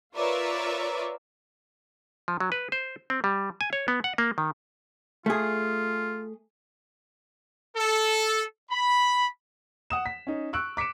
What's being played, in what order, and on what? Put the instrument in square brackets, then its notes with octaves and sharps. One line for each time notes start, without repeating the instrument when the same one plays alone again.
[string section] F4 A#4 B4 C#5 D5 E5
[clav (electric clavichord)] F3
F#3
B4
C5
C4
G3
G#5
C#5
B3
F#5
A#3
D#3
[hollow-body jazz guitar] A3 G#4 [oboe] F4
[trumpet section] A4
B5
[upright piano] F#5 D#6 E7
B6
C#4 D#4
C#6 E6 F#6 D7
D6 B6 C#7 D7 E7